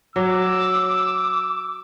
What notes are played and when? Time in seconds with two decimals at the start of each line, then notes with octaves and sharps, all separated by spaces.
0.16 F#3 D6 E6